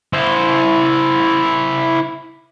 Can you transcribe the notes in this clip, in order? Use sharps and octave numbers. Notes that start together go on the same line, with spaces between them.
E4 C5